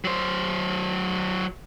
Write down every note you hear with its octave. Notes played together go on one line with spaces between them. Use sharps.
F#3 C5